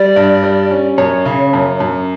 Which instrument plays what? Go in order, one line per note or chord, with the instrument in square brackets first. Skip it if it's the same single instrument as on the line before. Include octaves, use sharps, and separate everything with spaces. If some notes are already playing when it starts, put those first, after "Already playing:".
Already playing: [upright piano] G3 [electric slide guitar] D5
[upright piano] G2
G3
C#4
[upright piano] F#2 [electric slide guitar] C#5
[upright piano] C#3
F#2
F#2